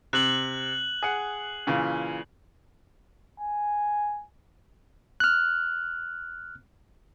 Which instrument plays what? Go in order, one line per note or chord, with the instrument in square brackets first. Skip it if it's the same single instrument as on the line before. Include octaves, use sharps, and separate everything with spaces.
[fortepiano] C3 [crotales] F#6 F#7
[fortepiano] G#4 F#5
A#2 C#3 E3
[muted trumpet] G#5
[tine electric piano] F6 F#6